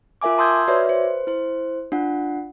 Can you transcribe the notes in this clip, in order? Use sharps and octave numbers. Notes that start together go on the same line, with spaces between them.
F4 A#4 E5 G#5 D6
A5 C6 D#6 E6 G6 G#6
F#4 B4 C#5 D5 E5
B4 C5
E4 C5
D4 F4 F#5